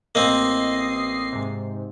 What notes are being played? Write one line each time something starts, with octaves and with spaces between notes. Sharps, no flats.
A1 A#3 C4 D#5 C7
G#2 C3